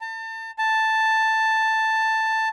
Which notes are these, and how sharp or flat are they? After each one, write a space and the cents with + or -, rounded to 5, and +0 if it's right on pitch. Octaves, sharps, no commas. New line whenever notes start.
A5 +35
A5 +5